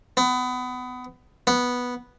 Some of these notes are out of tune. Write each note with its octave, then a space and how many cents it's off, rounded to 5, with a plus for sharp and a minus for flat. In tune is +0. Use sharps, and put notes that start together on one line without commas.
B3 +25
B3 -5